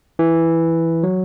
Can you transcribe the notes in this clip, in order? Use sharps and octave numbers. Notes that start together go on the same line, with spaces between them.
E3
F#3